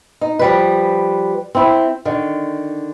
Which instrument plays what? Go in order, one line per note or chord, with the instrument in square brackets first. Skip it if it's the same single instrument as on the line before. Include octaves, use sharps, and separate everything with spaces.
[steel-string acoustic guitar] D#4
F3 G3 B4
C4 E4
D3 D#3